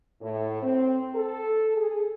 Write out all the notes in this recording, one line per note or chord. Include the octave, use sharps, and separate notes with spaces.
A2
C4
A4
G#4